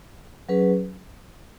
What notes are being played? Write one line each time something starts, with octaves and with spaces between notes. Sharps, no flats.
F#3 C#4 G#4 B4